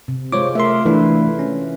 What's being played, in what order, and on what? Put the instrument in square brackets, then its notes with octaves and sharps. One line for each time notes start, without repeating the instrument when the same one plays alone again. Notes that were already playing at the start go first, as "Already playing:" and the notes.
[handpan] C3
[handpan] G#3 F4 [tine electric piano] C5 C#5 D6
[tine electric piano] A3 C6 [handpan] A#4 E5
[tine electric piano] E3 A3 D4 [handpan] E4 B4
[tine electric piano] C#4